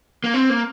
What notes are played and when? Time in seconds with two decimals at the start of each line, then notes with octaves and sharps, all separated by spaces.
0.24 A#3
0.34 C4
0.50 A#3